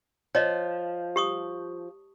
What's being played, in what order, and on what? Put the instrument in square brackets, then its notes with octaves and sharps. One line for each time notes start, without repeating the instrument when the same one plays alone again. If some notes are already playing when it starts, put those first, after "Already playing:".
[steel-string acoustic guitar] F3 [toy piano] C#5 D#5
[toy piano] G4 C#6 D#6